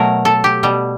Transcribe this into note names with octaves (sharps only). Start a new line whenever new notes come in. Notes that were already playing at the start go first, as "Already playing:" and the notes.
Already playing: B2 F#3 A3 A#4
A4
G4
B2 G3